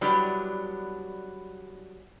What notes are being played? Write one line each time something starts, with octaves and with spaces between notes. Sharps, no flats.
F#3 G3 B3 D4 E4 G4